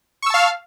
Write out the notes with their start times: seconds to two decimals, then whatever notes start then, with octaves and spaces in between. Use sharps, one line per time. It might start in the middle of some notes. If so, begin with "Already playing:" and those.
0.22 C#6
0.26 E6
0.30 A5
0.34 F5
0.38 F6